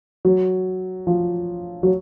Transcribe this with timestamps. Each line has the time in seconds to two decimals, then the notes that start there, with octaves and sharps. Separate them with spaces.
0.25 F#3
1.07 F3
1.83 F#3